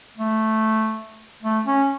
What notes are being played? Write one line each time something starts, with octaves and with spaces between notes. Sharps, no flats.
A3
A3
C#4